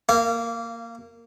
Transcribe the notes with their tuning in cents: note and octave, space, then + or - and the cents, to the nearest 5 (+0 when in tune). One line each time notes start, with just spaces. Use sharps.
A#3 -10 F5 -30